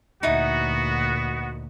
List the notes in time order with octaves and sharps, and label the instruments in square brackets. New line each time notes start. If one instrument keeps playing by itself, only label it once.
[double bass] D2 A#2 [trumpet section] B3 F#4 [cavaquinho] D#4 E4 D#5